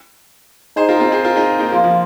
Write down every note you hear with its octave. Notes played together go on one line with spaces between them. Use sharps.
D#4 G#4 C5
F4 A#4
C4 F4
G#4 C5
F4 A#4
D#4 G#4
A#3 D#4
F3 A#3 F4
F3